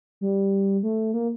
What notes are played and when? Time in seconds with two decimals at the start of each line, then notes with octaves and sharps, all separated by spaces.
0.21 G3
0.83 A3
1.14 A#3